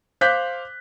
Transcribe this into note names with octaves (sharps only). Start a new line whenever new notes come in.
C5 F5 D6 F#6 G6 B6